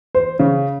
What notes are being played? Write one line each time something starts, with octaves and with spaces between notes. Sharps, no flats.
C5
C#3